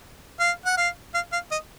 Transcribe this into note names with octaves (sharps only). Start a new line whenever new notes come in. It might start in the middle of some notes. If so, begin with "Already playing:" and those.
F5
F#5
F5
F5
F5
D#5